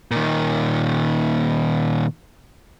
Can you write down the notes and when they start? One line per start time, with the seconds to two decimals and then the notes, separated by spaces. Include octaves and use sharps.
0.11 A#2 D#3